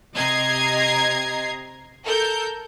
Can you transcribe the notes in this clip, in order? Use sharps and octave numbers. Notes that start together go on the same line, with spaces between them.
C3 D#5 A#5 G#6 C7
A4 A#4 G6